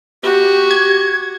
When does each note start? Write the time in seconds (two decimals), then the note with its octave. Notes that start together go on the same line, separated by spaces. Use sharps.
0.23 F#4 G4
0.71 G#6